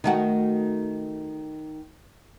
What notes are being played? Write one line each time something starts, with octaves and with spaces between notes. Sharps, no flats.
D#3 A3 F#4